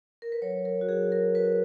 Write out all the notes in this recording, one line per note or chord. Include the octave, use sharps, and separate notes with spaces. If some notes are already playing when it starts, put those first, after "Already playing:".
A#4
B4
F#3 C#5
A#4
F#4
F#3 G#4
A#4
F#4 B4